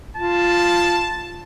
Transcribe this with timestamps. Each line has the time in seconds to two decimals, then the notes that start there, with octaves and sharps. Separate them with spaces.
0.17 F4 A5